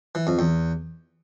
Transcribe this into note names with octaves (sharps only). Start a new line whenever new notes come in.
E3
F2
E2